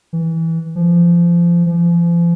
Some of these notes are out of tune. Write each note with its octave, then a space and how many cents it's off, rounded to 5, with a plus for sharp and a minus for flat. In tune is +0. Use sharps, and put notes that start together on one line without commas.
E3 -10
F3 -25
F3 -40